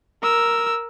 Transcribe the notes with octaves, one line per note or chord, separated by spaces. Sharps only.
A#4 E6